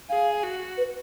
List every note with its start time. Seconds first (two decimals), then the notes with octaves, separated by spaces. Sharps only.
0.09 G#4 F5
0.43 F#4
0.77 B4